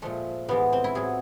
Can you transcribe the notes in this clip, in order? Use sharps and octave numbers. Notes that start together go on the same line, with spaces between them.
A#2 F3 G#3 A3
A2 E3 G#3 B3
C4
E4
A2 F#3 G#4